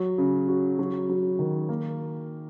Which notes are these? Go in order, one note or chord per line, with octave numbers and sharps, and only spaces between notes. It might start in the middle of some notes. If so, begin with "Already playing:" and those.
Already playing: F#3
C#3
F#4
F#3
F#3
D#3
A#3